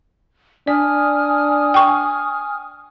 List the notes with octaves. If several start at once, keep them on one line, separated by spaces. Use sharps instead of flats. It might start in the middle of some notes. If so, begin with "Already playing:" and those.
D4 D5 G#5 D#6 F6
G5 C#6